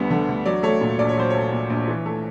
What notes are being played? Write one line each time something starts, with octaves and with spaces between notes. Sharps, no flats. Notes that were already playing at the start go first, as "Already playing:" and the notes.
Already playing: D2 D3 G3 B3
D3
D2
F#3 D5
A3 C#5
A#2
A#1 D5
C#5
F#3 C5
A3 C#5
A#2
A#1
E3
A3